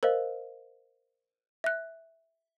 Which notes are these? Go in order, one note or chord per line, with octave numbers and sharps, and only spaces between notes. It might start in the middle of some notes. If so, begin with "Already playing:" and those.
A#4 C5 D#5 F5
E5 F#6